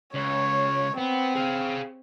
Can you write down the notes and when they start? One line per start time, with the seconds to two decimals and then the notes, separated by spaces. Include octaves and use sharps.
0.14 C#2 C#5
0.98 B3 C4
1.35 G#4 F5